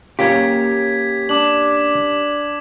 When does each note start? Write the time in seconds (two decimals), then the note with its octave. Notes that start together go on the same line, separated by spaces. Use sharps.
0.19 A#3 C#4 F4 G4 C#5 G#6 B6
1.29 D4 D6 F#7